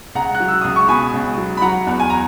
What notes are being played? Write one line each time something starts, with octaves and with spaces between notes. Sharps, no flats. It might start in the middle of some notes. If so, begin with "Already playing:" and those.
C#2 F#5 A#5
F#6
F#3
E6
C#2 D#6
C#6
B2 G#5 B5
C#2
F#3
B5
F#3 F#5 A#5
E2
G#5
A#5